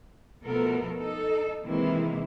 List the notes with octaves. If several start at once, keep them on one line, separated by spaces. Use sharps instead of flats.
B2 F3 A3 B3 A4 A#4
D#4 A4
C3 D#3 E3 G#3 A#3 E4